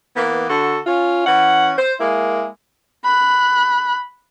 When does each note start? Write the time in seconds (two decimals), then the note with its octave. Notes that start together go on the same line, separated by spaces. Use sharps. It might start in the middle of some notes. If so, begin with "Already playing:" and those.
0.16 E3 A#3 B3
0.50 D3 F#4 A4
0.86 C#4 F4
1.26 E3 C#4 F#5
1.78 C5
2.00 G#3 A#3 E4
3.04 B5 F#6